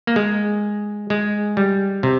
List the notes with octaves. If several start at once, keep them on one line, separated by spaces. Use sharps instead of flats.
A#3
G#3
G#3
G3
C3